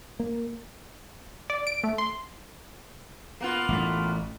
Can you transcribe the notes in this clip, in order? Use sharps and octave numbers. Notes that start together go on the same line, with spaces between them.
A#3
D5
D7
A3
C6
A#3 B3 F4
A1 A3